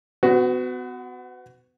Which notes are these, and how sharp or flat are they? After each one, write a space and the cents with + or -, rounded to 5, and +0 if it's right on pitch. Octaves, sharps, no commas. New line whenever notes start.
B3 +35 F#4 +0